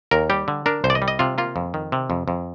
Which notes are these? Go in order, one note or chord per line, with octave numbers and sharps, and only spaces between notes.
D#2 A#4
G3 G4
D3
D4 A#4
C2 C5
D5
D#5
G3
D#5
C3 F4
A#3 F4
F2
D#3
C3
F2
F2